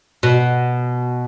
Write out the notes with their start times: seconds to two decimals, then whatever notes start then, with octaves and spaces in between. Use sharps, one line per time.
0.23 B2